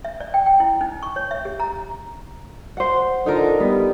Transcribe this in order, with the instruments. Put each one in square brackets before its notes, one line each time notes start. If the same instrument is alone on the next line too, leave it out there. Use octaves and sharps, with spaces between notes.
[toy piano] E5
D5
G5
G5
E4
D#4
C#6
C#5
E5
G4
A#5
[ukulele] C5 F#5
[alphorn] D3 [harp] D#4 F4 A#4
[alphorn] G3 [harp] B3